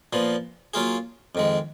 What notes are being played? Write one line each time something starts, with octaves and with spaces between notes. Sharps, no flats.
A#2 F3 B3
F#3 A#3 F4 G#4
F2 D#3 G#3